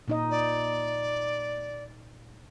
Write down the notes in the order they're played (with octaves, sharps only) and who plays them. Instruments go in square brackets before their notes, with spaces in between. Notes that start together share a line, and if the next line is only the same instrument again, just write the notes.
[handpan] A#2 D#4 D#5
[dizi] D5